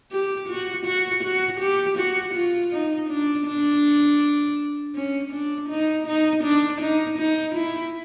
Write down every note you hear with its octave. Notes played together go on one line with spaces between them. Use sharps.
G4
F#4
F#4
F#4
G4
F#4
F4
D#4
D4
D4
C#4
D4
D#4
D#4
D4
D#4
D#4
E4